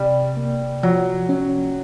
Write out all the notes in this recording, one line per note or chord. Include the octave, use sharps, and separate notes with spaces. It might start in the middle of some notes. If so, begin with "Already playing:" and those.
Already playing: C3 G3
A#3
F3 F#3
C#4